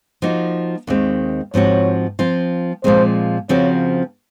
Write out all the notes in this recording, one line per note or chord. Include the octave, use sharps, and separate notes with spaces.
F3 A#3 D#4 F#4
D#2 D#3 G#3 C4
G#2 F3 C4 F#4 C#5
F3 C4 F4
A#2 F3 G#3 C4 C5
C#3 F3 C4 F#4 C#5